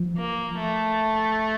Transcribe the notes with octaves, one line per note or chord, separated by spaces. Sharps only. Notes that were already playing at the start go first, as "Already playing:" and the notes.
Already playing: F3
A#3
A3